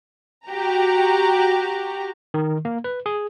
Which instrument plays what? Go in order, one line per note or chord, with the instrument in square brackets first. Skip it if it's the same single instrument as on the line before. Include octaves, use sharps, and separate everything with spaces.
[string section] F#4 G4 A#5
[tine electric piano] D#3
A#3
B4
G#4